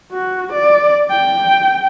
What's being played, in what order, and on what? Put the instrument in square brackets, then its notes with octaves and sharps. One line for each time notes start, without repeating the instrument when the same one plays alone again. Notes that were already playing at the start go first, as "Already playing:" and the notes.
[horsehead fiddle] F#4
D5
G5